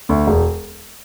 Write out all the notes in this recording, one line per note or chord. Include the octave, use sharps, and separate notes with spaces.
D2
E1